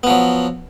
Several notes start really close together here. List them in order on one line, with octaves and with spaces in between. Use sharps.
B3 F3 F#3